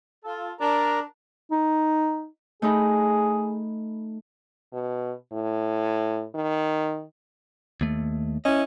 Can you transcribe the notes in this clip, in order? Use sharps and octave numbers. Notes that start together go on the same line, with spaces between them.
F4 A4
D4 A#4 A#5
D#4
A3 D#4 G#4 B5
B2
A2
D#3
D#2 A3
C#4 E4 D#5